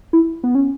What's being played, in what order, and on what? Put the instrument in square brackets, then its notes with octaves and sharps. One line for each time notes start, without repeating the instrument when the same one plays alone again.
[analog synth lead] E4
B3
C#4